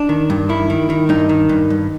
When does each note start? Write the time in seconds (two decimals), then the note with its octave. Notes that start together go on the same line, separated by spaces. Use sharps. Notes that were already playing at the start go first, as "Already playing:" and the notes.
Already playing: D4
0.09 D#3
0.30 G2
0.49 D#3 E4
0.70 D#3
0.90 D#3
1.09 G2 D#4
1.29 D#3
1.49 G2
1.70 G2